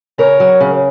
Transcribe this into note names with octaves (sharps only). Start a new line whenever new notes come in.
C#3 A#4 C#5
F#3
C#3